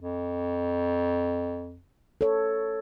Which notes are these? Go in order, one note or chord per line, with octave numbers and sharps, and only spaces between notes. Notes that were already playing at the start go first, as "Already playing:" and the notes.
F2
A4 C#5